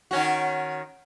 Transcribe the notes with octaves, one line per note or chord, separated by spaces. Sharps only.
D#3 C#4 F#4